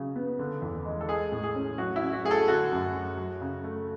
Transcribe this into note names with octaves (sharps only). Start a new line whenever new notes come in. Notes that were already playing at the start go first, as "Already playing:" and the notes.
Already playing: C#3 F#3
B3
D3
E2
G#3
A4
G#3 G#4
A2
G#4
C#4
F#3 F#4
E4
C#4
F#4
A3 G#4
A4
D3 F#4
F#2
F#3
F#3
C#3
A3